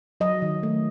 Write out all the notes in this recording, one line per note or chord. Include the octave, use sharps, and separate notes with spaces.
F#3 D#5
D#3
A3